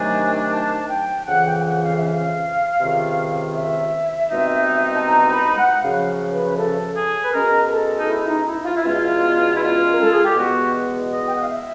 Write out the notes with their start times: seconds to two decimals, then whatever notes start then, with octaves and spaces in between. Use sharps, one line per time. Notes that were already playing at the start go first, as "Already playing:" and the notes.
Already playing: C3 D#3 F#3 A3 D4 G#5
0.51 A5
0.90 G5
1.28 F2 C#3 E3 F#5
1.46 G5
1.58 G5
1.65 F#5
1.84 F5
1.97 E5
2.10 F5
2.79 C#2 C3 D#3
3.55 E5
4.30 C2 B2 G#3 C4 D#4
4.95 A5
5.06 A#5
5.31 B5
5.57 F#5
5.81 F#2 C#3 F3 F5
6.32 B4
6.57 A4
6.94 G#4
7.23 B4
7.33 B2 G#3 C#4 A#4
7.64 A#4
7.71 A4
7.98 D#4
8.09 E4
8.28 D#4
8.46 E4
8.65 F4
8.76 E4
8.84 E2 B2 G#3 C#4 F4
9.55 E4
9.60 F4
9.90 A#4
10.02 A4
10.13 G#4
10.25 G4
10.35 E2 B2 G#3 B3 F#4
11.11 D#5
11.28 G5
11.35 F#5
11.42 F5
11.49 E5